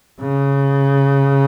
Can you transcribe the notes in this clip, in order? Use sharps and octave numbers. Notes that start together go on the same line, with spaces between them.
C#3